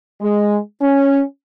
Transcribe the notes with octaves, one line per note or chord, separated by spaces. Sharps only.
G#3
C#4